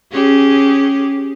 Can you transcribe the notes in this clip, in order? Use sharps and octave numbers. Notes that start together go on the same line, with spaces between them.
C#4 G4 G#4